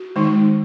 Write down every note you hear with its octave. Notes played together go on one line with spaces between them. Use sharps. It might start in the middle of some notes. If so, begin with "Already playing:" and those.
Already playing: F#4
D#3 G#3 D#4